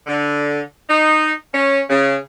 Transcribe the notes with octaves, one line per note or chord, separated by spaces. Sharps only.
D3
D#4
C#4
C#3